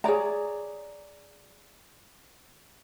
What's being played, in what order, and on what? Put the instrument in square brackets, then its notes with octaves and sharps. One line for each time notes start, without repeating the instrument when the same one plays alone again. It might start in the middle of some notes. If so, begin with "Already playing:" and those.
[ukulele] G#4 C#5 D5 A#5